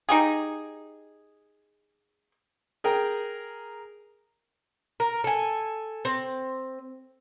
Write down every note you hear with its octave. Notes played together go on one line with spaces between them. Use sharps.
D#4 G4 G#4
G#4 A#4 G5
A#4
A4 G#5
C4